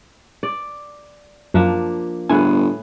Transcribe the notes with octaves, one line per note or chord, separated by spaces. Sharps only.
D5
F#2 F3 A#3 D4
G1 A2 B3 G#4 G#5